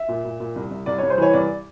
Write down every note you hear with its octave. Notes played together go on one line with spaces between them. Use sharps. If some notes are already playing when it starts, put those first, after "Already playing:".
Already playing: E5
A#2
A#2
A#2
C2
C2
C2 D5
C2 C#5
C5
E3 C#5
C2 D5